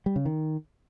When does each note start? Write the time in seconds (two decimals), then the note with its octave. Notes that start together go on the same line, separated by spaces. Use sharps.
0.06 G3
0.16 C#3
0.25 D#3